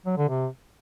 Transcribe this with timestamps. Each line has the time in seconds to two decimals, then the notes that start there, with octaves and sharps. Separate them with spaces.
0.06 F#3
0.18 D3
0.29 C3